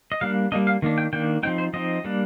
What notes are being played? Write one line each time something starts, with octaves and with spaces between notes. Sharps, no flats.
D#5
G3 A#3 D4 F5
G3 A#3 D4 D#5
F5
D#3 A#3 D4
G5
D#3 A#3 D4 G5
F3 C4 D#4 G5
C5
F3 C4 D#4 D#5
G3 A#3 D4